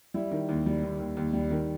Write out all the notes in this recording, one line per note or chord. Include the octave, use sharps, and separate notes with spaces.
G3 E4
D#3
D#2
G3
D#2
D#2
D#2
G3
D#3